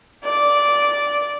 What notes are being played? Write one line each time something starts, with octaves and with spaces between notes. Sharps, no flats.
D5